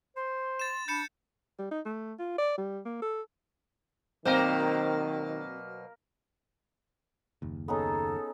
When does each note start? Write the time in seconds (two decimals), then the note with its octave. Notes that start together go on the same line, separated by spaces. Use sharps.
0.16 C5 C6
0.59 A6 E7
0.88 D4 B5 G6 C#7 E7
1.59 G3
1.71 D#4
1.86 A3
2.19 F4
2.38 D5
2.58 G3
2.85 A#3
3.02 A4
4.25 B2 D#3 F#3 A#3 C4 A#4 C5 A#5
7.42 F#1 D#2
7.68 B3 C#4 D#4 G#4 A4